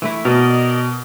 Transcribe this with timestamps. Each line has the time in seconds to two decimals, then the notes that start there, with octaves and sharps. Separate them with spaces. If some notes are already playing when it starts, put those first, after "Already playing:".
0.02 E3 A3 E4
0.25 B2 A#4 D5 D#5